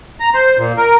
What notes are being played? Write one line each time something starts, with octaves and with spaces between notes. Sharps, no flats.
A#5
C5
A#2
A#4